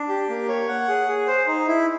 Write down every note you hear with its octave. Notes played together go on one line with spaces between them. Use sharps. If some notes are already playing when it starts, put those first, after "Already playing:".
Already playing: D4
G4
A#3
C#5
F#5
G#4
G#4
C5
D#4
E4